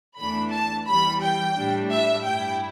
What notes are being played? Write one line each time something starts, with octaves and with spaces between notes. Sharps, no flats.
E2 E3 A3 D4 B5
A5
E2 E3 G3 B5
G5
A2 G3 D4
E5
G2 G3 E4 G5